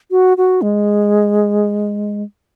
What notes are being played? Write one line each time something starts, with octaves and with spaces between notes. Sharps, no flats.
F#4
F#4
G#3